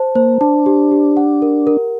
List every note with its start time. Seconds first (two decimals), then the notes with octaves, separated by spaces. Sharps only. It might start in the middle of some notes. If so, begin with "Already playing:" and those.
Already playing: C5 A5
0.15 A#3 C5
0.41 D4 A5
0.66 G4
0.91 G4
1.17 F#5
1.42 A#4
1.67 A#4